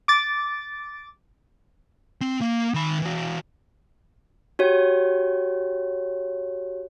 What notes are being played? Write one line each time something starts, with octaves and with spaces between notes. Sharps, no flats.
D6 A6
C4
A#3
D#3 B5
E3 F#4
F#4 G4 C#5